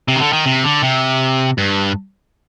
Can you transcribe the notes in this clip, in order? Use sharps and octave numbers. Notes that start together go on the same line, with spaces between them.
C3
D#3
D3
D#3
C3
D3
C3
G2